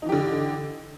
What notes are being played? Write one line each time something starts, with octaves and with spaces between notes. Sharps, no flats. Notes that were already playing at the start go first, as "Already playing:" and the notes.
D3 E3 D#4 G4